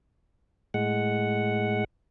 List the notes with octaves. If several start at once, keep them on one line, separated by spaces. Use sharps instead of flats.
A2 G#3 F#5